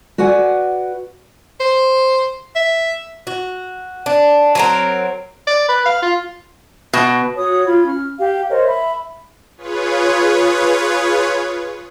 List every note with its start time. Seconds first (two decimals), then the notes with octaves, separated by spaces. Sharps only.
0.18 F#4 B4 D5 F#5 G#5
1.60 C5
2.56 E5
3.27 F#4
4.06 D4
4.55 F#3 C4 A#4
5.47 D5
5.69 B4
5.86 F5
6.02 F4
6.93 B2
7.37 F#4 C#5 D#6
7.66 F4 B5 G#6
7.86 C#4 F6
8.18 G4 F5
8.50 A#4 C5 C#5 D#5
8.65 E5 B5
9.57 F4 G#4 B4 C#5